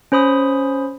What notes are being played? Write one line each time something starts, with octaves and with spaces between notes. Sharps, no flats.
C#4 C5 B5 D#6